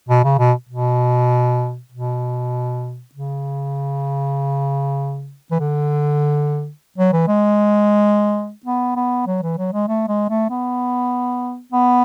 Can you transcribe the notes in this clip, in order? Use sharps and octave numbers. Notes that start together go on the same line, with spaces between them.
B2
C#3
B2
B2
B2
C#3
E3
D3
F#3
E3
G#3
B3
B3
F#3
E3
F#3
G#3
A3
G#3
A3
B3
B3